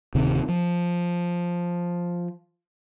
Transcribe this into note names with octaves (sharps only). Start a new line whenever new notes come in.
D1 C3 D#3
F3